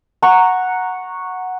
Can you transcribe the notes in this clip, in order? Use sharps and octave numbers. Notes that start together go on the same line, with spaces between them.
F#5 A#5 C#6